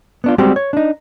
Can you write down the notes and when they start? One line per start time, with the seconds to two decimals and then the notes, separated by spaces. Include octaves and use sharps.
0.24 B3 D4 F4
0.38 G3 G#3 C4 F#4 G4
0.56 C#5
0.73 D4 D#4